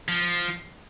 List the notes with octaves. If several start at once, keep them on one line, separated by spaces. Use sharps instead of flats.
F3